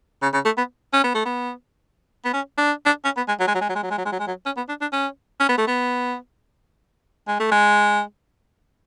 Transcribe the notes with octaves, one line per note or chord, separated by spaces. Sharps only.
C#3
C#3
A3
B3
C#4
B3
A3
B3
B3
C#4
D4
D4
C#4
B3
G#3
F#3
G#3
F#3
G#3
F#3
G#3
F#3
G#3
F#3
G#3
F#3
G#3
F#3
C#4
B3
D4
D4
C#4
C#4
B3
A3
B3
G#3
A3
G#3